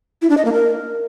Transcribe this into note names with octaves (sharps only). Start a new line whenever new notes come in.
E4
D4
D#5
A#3
A#4